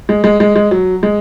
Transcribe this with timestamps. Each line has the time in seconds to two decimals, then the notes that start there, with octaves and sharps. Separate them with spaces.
0.09 G#3
0.24 G#3
0.40 G#3
0.56 G#3
0.71 F#3
1.03 G#3